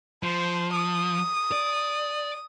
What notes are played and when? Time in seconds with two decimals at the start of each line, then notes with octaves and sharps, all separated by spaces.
0.23 F3 C5
0.72 D#6
1.52 D5